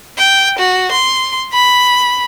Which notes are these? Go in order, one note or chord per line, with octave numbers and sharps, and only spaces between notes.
G5
F#4
C6
B5